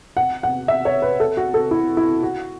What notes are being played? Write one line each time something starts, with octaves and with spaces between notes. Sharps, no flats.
F#5
F#5
E5
C#5
B4
A4
F#4
A4
E4
E4
F#4